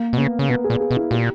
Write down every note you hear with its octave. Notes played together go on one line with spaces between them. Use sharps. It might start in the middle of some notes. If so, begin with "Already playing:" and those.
Already playing: A#3
B2
C#3 B3
C#3
B2 B3
G#4
A#2
G#4
B2
E4
A#2 G4